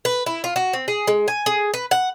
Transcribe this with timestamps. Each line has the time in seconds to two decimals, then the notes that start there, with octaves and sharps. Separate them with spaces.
0.05 B4
0.26 E4
0.44 F4
0.56 F#4
0.73 C4
0.88 G#4
1.07 G#3
1.28 G#5
1.46 G#4
1.74 B4
1.91 F#5